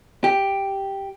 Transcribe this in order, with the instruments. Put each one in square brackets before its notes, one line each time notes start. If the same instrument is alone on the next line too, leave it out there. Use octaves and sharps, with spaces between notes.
[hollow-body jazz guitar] G4